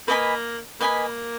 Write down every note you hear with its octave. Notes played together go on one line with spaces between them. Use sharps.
A#3 B4 D#5 G#5 B5
A#3 B4 D#5 G#5 B5